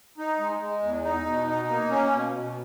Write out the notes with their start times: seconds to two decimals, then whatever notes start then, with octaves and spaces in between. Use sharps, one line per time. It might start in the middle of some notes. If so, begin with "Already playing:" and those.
0.18 D#4
0.39 G#3
0.61 G#3
0.82 E2
1.04 D#4
1.26 B2
1.47 D#4
1.68 A#3
1.90 C#4
2.11 B2
2.33 B2